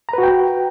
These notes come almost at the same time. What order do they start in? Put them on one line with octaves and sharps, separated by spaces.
A#5 B4 F#4 G5